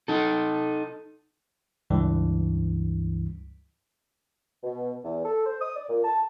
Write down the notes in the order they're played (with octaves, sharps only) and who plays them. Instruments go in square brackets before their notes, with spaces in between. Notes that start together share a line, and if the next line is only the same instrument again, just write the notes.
[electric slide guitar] D#4 A4
[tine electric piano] C#2 G2 E3
[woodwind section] B2
E2
A4
C5
D#6
D5
A#2
A5